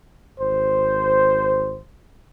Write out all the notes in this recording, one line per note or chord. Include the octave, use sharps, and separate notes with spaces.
G#1 C5